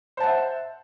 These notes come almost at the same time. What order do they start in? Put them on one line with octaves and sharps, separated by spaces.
C5 A5 F#5 E5